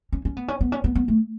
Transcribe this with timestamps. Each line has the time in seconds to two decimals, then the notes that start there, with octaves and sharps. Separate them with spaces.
0.12 C#4
0.25 C#4
0.37 B3
0.48 C#4
0.61 B3
0.72 C#4
0.84 B3
0.95 B3
1.08 A3